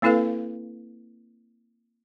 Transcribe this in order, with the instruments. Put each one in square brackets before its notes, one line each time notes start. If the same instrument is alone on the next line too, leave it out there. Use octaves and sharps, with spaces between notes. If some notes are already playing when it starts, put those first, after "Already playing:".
[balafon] A#3 C4 E4 A4 B4 F5